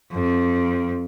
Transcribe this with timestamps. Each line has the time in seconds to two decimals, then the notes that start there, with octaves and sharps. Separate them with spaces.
0.12 F2